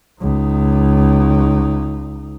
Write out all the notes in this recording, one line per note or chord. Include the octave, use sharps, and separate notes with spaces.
C#2 D#4